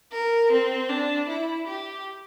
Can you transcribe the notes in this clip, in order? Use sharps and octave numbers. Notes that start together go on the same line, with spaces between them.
A#4
C4
D4
E4
G4